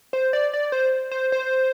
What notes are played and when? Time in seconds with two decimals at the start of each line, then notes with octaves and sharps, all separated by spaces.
0.13 C5
0.33 D5
0.54 D5
0.72 C5
1.11 C5
1.32 C5